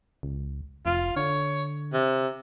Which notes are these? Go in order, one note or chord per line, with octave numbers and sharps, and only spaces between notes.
C#2
F1 F4
D3 C#5
C3